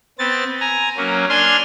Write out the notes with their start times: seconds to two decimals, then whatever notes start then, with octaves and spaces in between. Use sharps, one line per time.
0.19 B3 C4 A6
0.60 G#5 A#5
0.97 F#3 A#3 C#4
1.29 D4 G#5 C6 F6